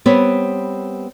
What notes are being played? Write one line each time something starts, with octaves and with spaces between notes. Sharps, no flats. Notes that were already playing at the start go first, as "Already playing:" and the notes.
G3 B3 C4 B4 C#5